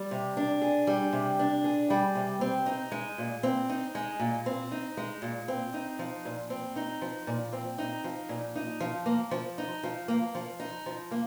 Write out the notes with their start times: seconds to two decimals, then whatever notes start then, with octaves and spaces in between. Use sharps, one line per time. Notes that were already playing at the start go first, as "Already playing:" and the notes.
Already playing: G3
0.11 C3
0.37 D4
0.62 G#4
0.87 G3
1.13 C3
1.39 D4
1.64 G#4
1.90 G3
2.15 C3
2.41 C4
2.66 D#4
2.92 G#3
3.18 A#2
3.43 C4
3.70 D#4
3.95 G#3
4.20 A#2
4.46 C4
4.72 D#4
4.97 G#3
5.22 A#2
5.48 C4
5.74 D#4
5.99 F3
6.25 A#2
6.50 C4
6.76 D#4
7.02 F3
7.27 A#2
7.53 C4
7.78 D#4
8.04 F3
8.29 A#2
8.56 D#4
8.80 F3
9.06 A#3
9.31 F3
9.58 D#4
9.83 F3
10.08 A#3
10.35 F3
10.60 D#4
10.86 F3
11.11 A#3